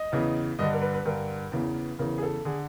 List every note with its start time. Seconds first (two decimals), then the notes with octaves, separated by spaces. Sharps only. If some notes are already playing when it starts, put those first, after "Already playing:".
Already playing: D#5
0.12 E2 C#3 E3
0.59 G2 D3 D#5
0.73 A#4
0.82 B4
0.94 B4
1.05 G2 D3 A#4
1.52 E2 C#3 E3
1.99 E2 C#3 E3 A#4
2.18 G#4
2.23 A4
2.45 D3 G#4